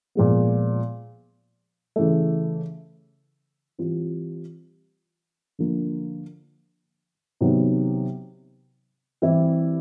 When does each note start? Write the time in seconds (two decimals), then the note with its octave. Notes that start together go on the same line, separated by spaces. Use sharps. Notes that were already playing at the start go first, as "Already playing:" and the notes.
0.15 A#2 F3 G#3 B3
1.96 C#3 E3 A3
3.78 E3 G3 C4 F4
5.59 D3 F3 A#3
7.41 C3 D#3 F#3 B3
9.22 E3 G3 C4 E4 G4